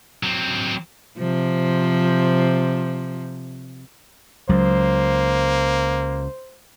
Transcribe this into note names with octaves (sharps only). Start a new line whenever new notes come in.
F#3 C4
C3 F3
C#2 F#3 A#3 C5